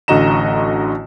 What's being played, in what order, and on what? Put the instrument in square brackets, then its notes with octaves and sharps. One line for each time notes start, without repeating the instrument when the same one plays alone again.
[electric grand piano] A1 D3 F#4 D#5 A#5 E7